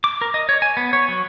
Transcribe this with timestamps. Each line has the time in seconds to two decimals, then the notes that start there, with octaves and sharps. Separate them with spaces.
0.04 D6
0.21 A#4
0.34 D#5
0.49 C#5
0.62 G#5
0.77 B3
0.93 C#5
1.09 F#3